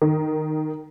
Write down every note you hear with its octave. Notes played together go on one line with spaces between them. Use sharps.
D#3